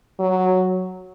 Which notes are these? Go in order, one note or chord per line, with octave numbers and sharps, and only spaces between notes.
F#3